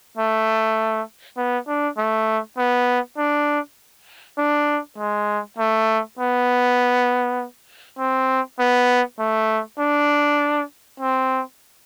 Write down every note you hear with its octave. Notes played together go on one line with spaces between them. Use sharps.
A3
B3
D4
A3
B3
D4
D4
G#3
A3
B3
C4
B3
A3
D4
C4